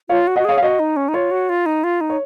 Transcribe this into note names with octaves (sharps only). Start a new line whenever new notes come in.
F4 C#5 F5
F#4
D#5 F#5
F#4
G#4 C#5 F5
F5
F#4 D#5
D#4
C#4
D#4
F4 C#5
F#4
F4
D#4
F4
D#4
C#5